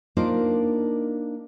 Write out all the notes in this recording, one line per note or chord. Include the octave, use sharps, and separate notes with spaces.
A#3 D4 D#4 F4 A#4 C5